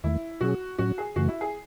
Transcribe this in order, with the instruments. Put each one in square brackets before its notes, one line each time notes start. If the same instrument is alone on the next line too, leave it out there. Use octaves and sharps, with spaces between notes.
[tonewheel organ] E2 D#3 A3 [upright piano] E4
[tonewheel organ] B2 F#3 C#4 G#4 [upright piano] F#4
[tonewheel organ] A2 F#3 C#4 [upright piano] F#4
[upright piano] G#4
[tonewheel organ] F#2 C#3 E3 A3 [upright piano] F#4
[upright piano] E4
G#4